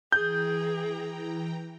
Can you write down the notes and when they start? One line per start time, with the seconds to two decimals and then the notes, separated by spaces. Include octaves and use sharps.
0.12 E3 G#4 G5 A#5 G6